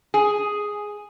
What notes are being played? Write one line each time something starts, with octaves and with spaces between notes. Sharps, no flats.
G#4